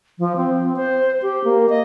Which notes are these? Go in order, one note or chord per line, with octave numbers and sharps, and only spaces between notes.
F3
C4
C5
G4
A#3
D#5